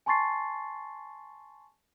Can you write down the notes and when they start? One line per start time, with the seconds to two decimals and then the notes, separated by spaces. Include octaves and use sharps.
0.06 G#5 A5 C6 C#6 A6 C7